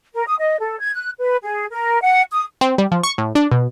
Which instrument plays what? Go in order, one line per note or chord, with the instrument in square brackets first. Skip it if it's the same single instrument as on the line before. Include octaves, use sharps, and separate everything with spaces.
[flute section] A#4
D#6
D#5
A4
G#6
F#6
B4
G#4
A#4
F#5
D#6
[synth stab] C4
G3
F3
C#6
A2
D4
B2